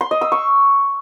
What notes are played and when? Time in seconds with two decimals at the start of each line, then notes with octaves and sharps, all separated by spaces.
0.01 C6
0.11 D#5
0.21 E6
0.32 C#6